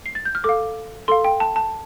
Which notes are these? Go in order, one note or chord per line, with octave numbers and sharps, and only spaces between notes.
C7
A6
G6
F6
A4 F5 D6
A4 F5 C6
G5
A5
A5